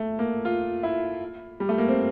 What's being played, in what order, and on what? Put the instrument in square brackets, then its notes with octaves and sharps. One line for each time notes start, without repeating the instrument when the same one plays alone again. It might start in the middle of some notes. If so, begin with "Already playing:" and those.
Already playing: [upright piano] A3
A#3
F4
E4
G3
A3
A#3
C4